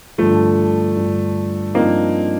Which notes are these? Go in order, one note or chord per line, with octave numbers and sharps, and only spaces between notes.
G2 D3 F3 A3
G2 D3 F3
G2 F3 A#3 C4 D#4